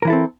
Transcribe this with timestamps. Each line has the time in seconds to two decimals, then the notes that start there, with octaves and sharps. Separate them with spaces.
0.02 A#4
0.05 E3
0.07 E4
0.10 A4
0.12 C4